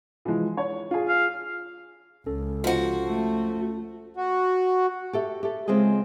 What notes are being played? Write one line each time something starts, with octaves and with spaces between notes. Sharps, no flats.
E3 F3 G#3
C#5
F4 G#4
F5
C#2 C#4 A4
F3 F#4
A3
F#4
G4 A4 E5
G4 A4
C#3 G#3 C4 F4 G#4 D#5